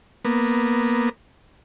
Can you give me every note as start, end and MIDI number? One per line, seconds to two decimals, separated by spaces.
0.25 1.09 58
0.25 1.09 59